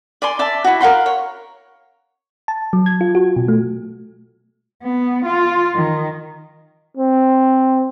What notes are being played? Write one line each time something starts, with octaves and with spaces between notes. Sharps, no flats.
D5 G#5 C6
D5 E5 A5
E4 F#4
A#4 F5 F#5 C6
C#5
A5
F#3
G#6
F4
F#4
B2
A3
B3
F4
D#3
C4